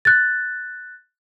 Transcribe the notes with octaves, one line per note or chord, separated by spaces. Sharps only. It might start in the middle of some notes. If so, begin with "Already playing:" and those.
F#6 A6